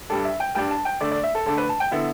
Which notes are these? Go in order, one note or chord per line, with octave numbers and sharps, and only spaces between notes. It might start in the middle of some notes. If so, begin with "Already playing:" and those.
G2 G3 D4 A4
E5
G5
G2 G3 D4 G5
A5
G5
D3 A3 D4 D5
D5
E5
A4
D3 A3 D4 A4
B4
A5
G5
D3 B3 E4